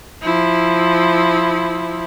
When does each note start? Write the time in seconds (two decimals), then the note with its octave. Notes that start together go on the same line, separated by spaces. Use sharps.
0.22 F3 E4